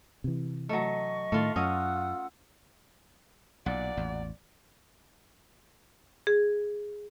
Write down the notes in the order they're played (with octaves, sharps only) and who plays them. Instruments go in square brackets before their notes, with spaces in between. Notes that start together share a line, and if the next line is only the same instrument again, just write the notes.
[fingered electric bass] C3 E3
[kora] F#3 A3 [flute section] D#5 C#6
[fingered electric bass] A2 D#3 [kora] A3 F4
[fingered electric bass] F#2 [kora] C#4 D#5 [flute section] F4 F#5 E6
[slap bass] B1 [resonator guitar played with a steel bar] A#2 F#5 [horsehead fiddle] D5
[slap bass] A1 E2
[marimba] G#4